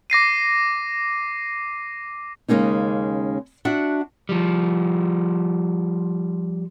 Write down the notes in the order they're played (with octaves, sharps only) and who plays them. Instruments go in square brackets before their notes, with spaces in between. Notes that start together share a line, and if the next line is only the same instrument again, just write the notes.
[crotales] D6 A#6 C7 D#7
[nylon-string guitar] D#2 C#3 G#3 A#3 C#4 D#4
D4 F#4 E5 F#5
[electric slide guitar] F3 G3